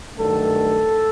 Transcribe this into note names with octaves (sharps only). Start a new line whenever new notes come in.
G2 D#3 F#3 A3 A4